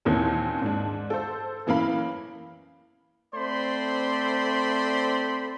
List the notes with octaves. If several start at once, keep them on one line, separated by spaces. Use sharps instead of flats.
D#2 A#2 D#3 E3 C4 C#4
G#2 D4
A4 C5
F#2 E3 A#3 F5 B5
A3 C4 C5 D5 B5 C6